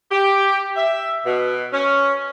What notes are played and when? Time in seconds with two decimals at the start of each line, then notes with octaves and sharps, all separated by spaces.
0.11 G4
0.76 E5
1.26 B2
1.72 C#4